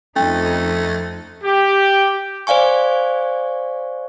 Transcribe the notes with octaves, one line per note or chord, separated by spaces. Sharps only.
F2 A3 C#4 D#4
G4
C5 D5 F5 G#5 C#6